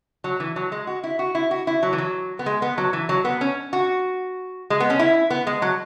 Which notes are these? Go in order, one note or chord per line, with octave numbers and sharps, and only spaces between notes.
F#3
E3
F#3
G#3
F#4
E4
F#4
E4
F#4
E4
F#3
E3
F#3
B3
G#3
B3
F#3
E3
F#3
B3
C#4
F#4
G#3
B3
C#4
E4
B3
G#3
F#3